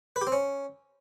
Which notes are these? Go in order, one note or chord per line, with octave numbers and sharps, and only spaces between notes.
B4
G4
C4
C#4